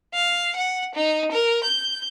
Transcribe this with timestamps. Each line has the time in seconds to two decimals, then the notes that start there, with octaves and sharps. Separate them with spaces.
0.14 F5
0.56 F#5
0.95 D#4
1.32 A#4
1.64 G6